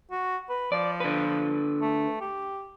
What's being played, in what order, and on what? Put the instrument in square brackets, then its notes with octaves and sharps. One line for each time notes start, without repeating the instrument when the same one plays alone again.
[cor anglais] F#4
B4
[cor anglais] F3 [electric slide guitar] D5
[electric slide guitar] D3 B4
[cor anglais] A3
G4